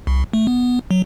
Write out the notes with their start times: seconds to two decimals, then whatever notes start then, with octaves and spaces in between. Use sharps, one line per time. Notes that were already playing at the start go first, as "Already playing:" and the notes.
0.07 C2
0.33 A3
0.47 B3
0.91 F#3